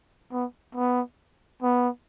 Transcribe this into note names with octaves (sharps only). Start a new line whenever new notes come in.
B3
B3
B3